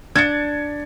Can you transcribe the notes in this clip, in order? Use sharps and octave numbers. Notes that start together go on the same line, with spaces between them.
D4 G#6 A6 C#7